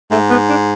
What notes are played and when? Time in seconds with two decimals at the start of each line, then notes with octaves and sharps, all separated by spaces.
0.11 G#2 A3
0.31 B3
0.49 D4